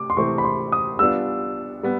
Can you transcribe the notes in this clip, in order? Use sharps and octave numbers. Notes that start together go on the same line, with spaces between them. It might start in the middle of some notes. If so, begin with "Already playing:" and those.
Already playing: C3 A3 D6
C6
C3 E3 A3 C4 C#6
B5
C6
D#6
G3 B3 D4 F4 E6
G3 B3